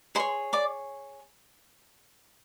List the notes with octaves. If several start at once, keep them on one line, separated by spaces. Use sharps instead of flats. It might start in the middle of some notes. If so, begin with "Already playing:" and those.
G#4 C5 C#5 C6
D5 D6